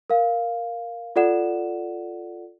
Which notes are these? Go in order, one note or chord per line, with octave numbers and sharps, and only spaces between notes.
A#4 F5
F4 A4 D5 F#5 E7